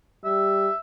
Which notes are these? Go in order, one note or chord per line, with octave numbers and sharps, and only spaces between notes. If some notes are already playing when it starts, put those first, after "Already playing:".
G3 E5